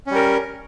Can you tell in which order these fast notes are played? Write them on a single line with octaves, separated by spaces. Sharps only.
C#4 G3 A#4